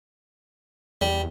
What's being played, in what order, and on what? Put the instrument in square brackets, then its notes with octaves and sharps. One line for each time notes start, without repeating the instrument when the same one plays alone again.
[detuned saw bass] E2 [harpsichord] G3